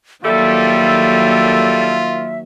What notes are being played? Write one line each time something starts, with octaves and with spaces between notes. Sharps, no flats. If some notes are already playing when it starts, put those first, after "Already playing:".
D#3 F#3 G3 A#3 F4 A4 E5